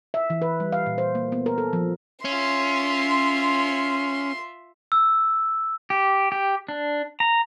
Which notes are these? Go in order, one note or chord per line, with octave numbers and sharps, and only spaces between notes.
E5
E3
B4
G3
F5
A#2
C5
A#3
B3
A#4
A4
F3
C#4 F4 E5 C6
E6
G4
G4
D4
A#5